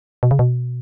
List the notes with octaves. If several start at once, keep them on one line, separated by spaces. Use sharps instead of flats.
B2
C#3
B2